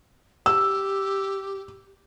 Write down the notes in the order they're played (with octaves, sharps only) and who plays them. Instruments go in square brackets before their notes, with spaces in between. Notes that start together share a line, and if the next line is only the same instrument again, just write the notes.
[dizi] G4 [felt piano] E6